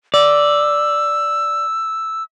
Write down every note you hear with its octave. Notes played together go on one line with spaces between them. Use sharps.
D5 E6